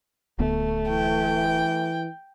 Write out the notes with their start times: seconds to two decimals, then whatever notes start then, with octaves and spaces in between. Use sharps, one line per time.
0.39 D1 D2 A3 B3
0.89 E3 G5